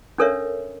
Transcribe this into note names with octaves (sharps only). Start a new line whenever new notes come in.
C#4 D4 A4 A#4 C#5 E5